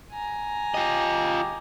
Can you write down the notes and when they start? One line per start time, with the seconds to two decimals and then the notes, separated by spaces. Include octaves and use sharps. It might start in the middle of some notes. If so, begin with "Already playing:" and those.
0.11 G#5 A#5
0.74 F4 G4 D#5